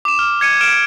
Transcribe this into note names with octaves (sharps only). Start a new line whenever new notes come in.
D6 E7
F6
G#6 C#7 D#7
F6 D7 E7